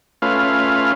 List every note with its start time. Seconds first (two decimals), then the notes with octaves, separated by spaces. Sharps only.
0.22 A3 C#4 F4 B4 F5